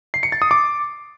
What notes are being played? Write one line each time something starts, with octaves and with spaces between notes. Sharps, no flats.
C7
C#7
A6
D#6
D6